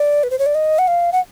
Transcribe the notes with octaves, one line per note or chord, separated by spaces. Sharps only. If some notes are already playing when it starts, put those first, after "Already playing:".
Already playing: D5
B4
C5
C#5
D5
D#5
F#5
F5
F#5